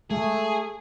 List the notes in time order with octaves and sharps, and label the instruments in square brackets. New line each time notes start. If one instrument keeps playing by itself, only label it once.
[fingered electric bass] G#3 [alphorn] A3 [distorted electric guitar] G#4